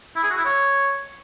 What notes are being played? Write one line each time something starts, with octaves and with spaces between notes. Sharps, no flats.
E4
G#4
F#4
E4
C#5